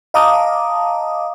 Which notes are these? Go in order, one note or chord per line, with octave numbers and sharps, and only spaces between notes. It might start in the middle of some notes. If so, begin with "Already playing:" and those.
D#5 F5 A5 A#5 D6 D#6